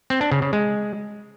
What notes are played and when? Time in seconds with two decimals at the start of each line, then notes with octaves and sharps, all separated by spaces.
0.10 C4
0.21 D4
0.32 C#3
0.42 C#3
0.53 G#3